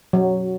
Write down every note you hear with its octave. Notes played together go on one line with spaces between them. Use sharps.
F#3